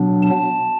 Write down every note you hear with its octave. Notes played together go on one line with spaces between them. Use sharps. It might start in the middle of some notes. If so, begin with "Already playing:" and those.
Already playing: B2 F#3 B3 D4
A5